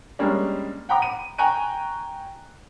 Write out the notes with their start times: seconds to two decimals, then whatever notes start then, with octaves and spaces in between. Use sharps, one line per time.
0.19 G3 G#3 A#3 C#4 D4
0.89 F#5 G5 A#5 B5 D6
1.02 D#7
1.38 G5 G#5 A#5 C#6 F#6 D#7